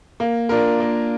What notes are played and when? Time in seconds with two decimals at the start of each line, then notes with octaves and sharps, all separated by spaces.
0.20 A#3
0.49 D4 F4 A#4
0.80 A#3